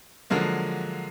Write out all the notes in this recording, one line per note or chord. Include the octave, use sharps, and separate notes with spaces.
D3 F3 F#3 G#3 A#3